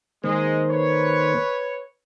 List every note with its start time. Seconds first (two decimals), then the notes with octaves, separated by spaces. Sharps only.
0.24 D#3 G#3 A#3 C5
0.70 B4 C#5